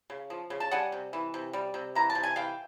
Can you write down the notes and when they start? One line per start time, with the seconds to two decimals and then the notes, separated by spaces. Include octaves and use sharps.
0.10 C#3
0.30 F3
0.50 C#3
0.60 A5
0.71 G3 F#5 G#5
0.92 C3
1.13 E3
1.34 C3
1.53 G3
1.74 C3
1.95 E3 A#5
2.10 A5
2.15 C3
2.23 G#5
2.36 E3 F5 G5